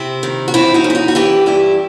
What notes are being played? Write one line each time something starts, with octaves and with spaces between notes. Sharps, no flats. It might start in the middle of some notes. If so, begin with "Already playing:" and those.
Already playing: C3 C4 E4
D#3
F#4
E3 C4 E4
D#4 F#4
F#2
E4
D#4 F#4
F#4
E3 E4 G4
G2 E4 G4